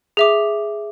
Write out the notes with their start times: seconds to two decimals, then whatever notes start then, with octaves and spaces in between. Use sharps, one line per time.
0.17 G#4 E5 D6